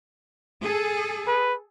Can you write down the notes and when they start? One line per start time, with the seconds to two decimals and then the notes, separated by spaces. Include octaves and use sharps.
0.62 G#4 A4
1.27 B4